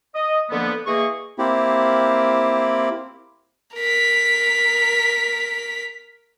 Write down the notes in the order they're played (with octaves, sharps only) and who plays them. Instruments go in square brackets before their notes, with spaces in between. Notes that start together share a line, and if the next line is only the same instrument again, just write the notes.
[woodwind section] D#5
D3 F3 A#3 B3
E3 A#3 G#4 D#5 C#6
[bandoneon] A#3 C4 E4 G4
[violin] A#4 B6